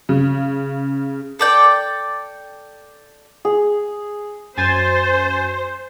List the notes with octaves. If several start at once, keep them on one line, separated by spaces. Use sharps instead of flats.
C#3
A4 D5 G5
G#4
F#2 C5 G#5 A6